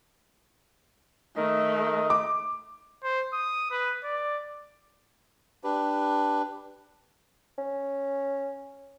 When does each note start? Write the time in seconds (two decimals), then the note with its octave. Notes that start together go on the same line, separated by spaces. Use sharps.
1.37 D#3 A3 D#5
2.10 D6
3.04 C5
3.33 D#6
3.71 B4
4.04 D5
5.64 D4 G4 B4
7.58 C#4